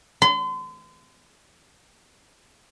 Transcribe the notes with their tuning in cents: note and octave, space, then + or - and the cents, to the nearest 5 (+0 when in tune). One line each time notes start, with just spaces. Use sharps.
C6 -40